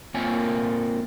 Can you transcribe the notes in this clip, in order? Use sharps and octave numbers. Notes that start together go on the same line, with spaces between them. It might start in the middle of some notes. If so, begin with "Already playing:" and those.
A#3 C4 F4 A#4 C#5 G#5